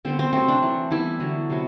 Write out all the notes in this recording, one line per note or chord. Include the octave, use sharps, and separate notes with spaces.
D3 G3 B3 C4
C4
C3 F#3 A3 C4
D4
E3 A3
E3 G3 B3 E4
D3 F#3 B3
C3 F#3 B3